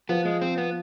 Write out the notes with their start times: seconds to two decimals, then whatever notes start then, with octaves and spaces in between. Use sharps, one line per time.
0.09 F3 B3
0.25 G#3
0.42 C4
0.58 B3